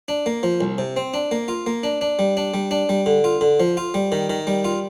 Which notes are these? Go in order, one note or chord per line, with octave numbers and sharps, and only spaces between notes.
D4
A#3
F3
C2
C3
C4
D4
A#3
F4
A#3
D4
D4
G3
D4
G3
D4
G3
D3
F4
D3
F3
F4
G3
D#3
D#3
G3
F4